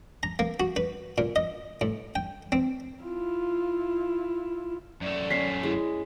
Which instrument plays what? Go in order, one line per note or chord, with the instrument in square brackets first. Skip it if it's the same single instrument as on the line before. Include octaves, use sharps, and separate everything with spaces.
[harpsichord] A#5
A#3
F#4
B4
A#2
D#5
A2
G5
C4
[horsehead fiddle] E4 F4
[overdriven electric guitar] F#2 A3 [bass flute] D5
[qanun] C#4 [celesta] B6 C7
[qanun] G#3 [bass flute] E4